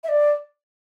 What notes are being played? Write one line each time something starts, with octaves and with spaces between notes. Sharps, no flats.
E5
D5